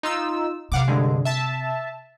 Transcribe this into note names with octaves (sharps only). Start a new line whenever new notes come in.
D#4 F4 E6
C3 F5 F#5 D6
G2 D3 G#3
E5 A5